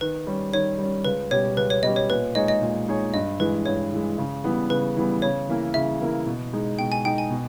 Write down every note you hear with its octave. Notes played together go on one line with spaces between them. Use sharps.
D#3 B4
G3 C#4
D#3 C#5
G3 C#4
C#2 B4
B2 G3 C#4 G4 C#5
C#2 B4
C#5
B2 G3 C#4 G4 D#5
C#5
A#2 B4
G#3 D#4 G#4 C#5 D#5
D#5
A#2
G#3 D#4 G#4 C#5
G2 D#5
E3 G#3 B4
G2 C#5
E3 G#3
C#3
E3 G3 B3
C#3 B4
E3 G3 B3
C#3 C#5
E3 A#3 E4 A#4
C#3 E5
E3 A#3 E4 A#4
B2
G#3 D#4 G#4
B2 G5
G#5
G#3 D#4 G#4 G5
G#5
B2